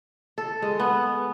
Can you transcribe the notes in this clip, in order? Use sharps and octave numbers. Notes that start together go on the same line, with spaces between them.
A4
G#3
B3